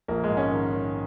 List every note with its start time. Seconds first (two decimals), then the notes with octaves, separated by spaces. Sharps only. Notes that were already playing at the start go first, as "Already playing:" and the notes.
0.08 A#1 A#3
0.24 G#3
0.30 G#2
0.37 C#4
0.52 D#3
0.73 D#3